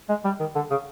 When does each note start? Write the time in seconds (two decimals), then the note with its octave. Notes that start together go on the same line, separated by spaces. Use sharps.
0.09 G#3
0.25 G3
0.40 D#3
0.56 D3
0.71 C#3